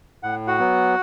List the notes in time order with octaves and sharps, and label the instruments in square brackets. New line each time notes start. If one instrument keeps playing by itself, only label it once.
[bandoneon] A2 F#5
F#4 F#5
F#3 B3